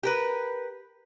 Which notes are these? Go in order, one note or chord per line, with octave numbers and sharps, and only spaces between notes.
G4 A#4 B4